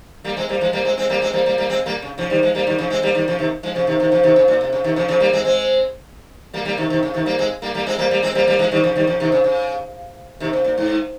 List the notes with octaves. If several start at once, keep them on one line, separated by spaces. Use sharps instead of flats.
G3 A#3
G#3 C4
G3 A#3
F3 G#3
G3 A#3
G#3 C4
G#3 C4
G3 A#3
G#3 C4
G3 A#3
G3 A#3
G3 A#3
G#3 C4
G3 A#3
C#3
C#3 F3
D#3 G3
F3 G#3
G3 A#3
D#3 G3
C#3 F3
G#3 C4
G3 A#3
D#3 G3
C#3 F3
C3 D#3
F3 G#3
C#3 F3
C3 D#3
C3 D#3
C#3 F3
C3 D#3
C#3
A#2
C3
C#3
C3 D#3
C#3 F3
C#3 F3
G3 A#3
G#3 C4
G#3 C4
G3 A#3
G3 A#3
C3 D#3
C3 D#3
C#3
C3 D#3
G3 A#3
G#3 C4
G3 A#3
G3 A#3
G#3 C4
G3 A#3
G3 A#3
G#3 C4
G3 A#3
G3 A#3
F3 G#3
D#3 G3
C#3 F3
D#3 G3
C#3 F3
C3 D#3
C#3
C#3
C3 D#3
C#3
A#2
G#2